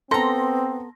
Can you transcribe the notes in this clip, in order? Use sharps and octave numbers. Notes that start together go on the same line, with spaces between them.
B3 C4 A4 A#5 C6 A#6